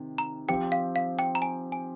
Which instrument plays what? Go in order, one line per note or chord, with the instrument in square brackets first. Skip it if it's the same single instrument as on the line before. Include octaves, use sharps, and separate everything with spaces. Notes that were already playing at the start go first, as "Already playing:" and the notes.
Already playing: [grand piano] C3 D#3
[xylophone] A#5
[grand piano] F3 C4 G4 [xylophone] G5
[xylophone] F5
F5
G5
A#5
G#5
G#5